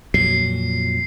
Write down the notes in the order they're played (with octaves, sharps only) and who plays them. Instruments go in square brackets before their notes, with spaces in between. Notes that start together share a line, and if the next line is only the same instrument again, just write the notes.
[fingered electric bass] F2 A#2 F#3 [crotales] C7